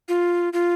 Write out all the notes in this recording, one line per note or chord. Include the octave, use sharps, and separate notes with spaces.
F4
F4